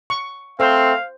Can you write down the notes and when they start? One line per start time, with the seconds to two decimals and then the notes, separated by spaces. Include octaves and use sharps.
0.10 C#6
0.60 A3 C4 C5 F5